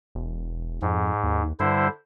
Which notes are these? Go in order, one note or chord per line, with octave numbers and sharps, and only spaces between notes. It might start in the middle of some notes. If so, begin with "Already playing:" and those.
E1
F2 G#2
D#2
G2 D3 E4 C5